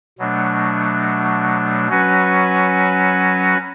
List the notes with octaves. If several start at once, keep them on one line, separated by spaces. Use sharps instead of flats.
B2 F#3 A3 D4
F#3 C#4 F#4 B4